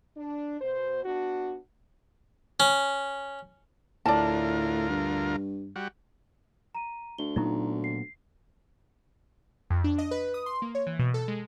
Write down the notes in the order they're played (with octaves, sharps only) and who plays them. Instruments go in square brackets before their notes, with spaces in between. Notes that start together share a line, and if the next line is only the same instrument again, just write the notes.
[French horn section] D4
B2 C5
B3 D4 F#4
[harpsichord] C#4
[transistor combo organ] D2 F4 A#4 [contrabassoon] A2 [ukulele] D5 A5
[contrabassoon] G2
[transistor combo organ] G3 F#4
[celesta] A#5 D#7
[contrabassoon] D2 [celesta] G7
[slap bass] A#2 F#3 B3 [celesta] D#4 E4 A#5
[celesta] C7
[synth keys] F2
D4
D#5
B4
D#6
C6
A#3
C#5
E3
B2
A4
G#3